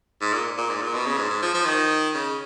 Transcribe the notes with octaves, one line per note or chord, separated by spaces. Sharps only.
G#2
A#2
A#2
G#2
A#2
B2
C#3
G#2
G#2
F3
F3
D#3
C#3